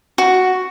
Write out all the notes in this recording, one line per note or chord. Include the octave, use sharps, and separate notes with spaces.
F#4